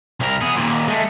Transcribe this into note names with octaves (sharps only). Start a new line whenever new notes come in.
C2 A#4
B3 G#4
D#2 A#2
G#3 A3